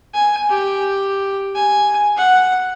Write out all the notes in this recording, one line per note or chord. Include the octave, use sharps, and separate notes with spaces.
G#5
G4
G#5
F#5